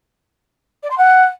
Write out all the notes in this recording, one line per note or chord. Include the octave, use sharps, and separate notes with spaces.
D5
C6
F#5